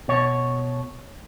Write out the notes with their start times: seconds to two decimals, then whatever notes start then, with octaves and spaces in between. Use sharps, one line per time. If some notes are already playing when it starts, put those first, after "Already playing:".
0.08 B2 C#5